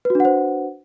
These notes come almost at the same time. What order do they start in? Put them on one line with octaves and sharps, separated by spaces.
B4 F#4 D4 F#5 C5